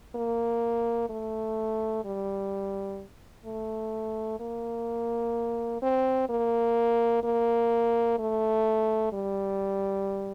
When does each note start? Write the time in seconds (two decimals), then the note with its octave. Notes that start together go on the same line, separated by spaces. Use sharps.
0.15 A#3
1.10 A3
2.05 G3
3.46 A3
4.40 A#3
5.82 C4
6.29 A#3
7.24 A#3
8.19 A3
9.13 G3